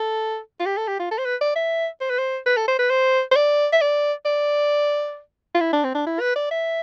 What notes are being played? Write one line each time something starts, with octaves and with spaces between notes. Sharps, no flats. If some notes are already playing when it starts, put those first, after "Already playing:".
Already playing: A4
F4
G4
A4
G4
F4
A4
C5
B4
D5
E5
C5
B4
C5
B4
A4
C5
B4
C5
C5
D5
E5
D5
D5
F4
E4
D4
C4
D4
E4
B4
D5
E5